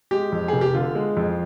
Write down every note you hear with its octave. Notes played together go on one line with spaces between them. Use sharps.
G#3 G4
F2
F1 G#4
G4
D3 F4
G#3
F2